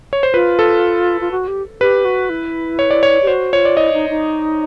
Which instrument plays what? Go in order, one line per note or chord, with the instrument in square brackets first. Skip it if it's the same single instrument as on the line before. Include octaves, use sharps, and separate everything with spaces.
[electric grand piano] C#5
C5
[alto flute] F4 [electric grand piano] B4
[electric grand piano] A4
[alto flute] F4
F#4
G4
[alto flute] G4 [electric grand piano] B4
[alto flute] F#4
E4
[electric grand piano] C#5
D5
C#5
[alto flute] G4
[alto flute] F#4 [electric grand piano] C5
[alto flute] F4 [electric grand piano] C#5
[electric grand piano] D5
[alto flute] E4 [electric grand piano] D#5
[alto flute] D#4
D#4